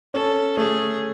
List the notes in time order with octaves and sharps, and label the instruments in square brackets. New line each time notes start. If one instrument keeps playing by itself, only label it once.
[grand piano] C#4 [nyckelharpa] A4
[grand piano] A3 [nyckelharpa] G#4